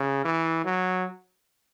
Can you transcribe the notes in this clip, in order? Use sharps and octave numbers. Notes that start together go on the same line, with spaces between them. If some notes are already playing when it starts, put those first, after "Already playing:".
Already playing: C#3
E3
F#3